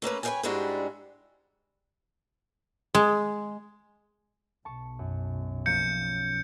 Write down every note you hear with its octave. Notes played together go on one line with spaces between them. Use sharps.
A3 A#3 C#4 B4
B4 C#5 D#5 F5 G5 G#5
G#2 G3 G#3 D4 E4 F#4
G#3
B1 A5 C#6
F#2
F3 A#3 C#4 G6 C#7